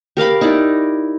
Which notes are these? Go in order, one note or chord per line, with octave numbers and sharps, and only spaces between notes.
G4 A#4 F5 B5
D#4 E4 D5